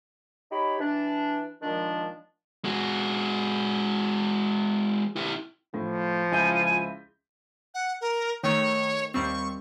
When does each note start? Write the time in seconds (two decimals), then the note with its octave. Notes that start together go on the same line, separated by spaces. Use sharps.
0.51 D#4 G4 C#5 B5
0.79 E3 D4
1.62 A#2 D#3 F3 G#3 D4
2.64 G#3 F#4
5.16 E4 G4
5.74 A2 F3
6.31 C#2 E4 G#5 G6
7.74 F#5
8.01 A#4
8.43 D#3 A3 C#5
9.14 D#2 G3 C4 C#6